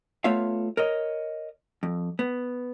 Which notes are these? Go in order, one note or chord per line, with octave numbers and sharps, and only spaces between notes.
A3 B3 F4 C#5 E5 F5
A#4 C#5 D#5
F2
B3